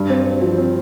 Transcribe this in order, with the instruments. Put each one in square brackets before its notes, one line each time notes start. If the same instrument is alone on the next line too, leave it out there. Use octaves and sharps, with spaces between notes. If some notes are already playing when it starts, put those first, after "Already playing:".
Already playing: [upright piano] G2
C4
C4
F3
C4